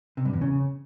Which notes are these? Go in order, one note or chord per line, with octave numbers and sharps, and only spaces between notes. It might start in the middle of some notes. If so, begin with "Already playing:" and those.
C3
G2
E2
C#3